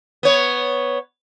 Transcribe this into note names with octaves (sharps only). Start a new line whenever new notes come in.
B3 C#5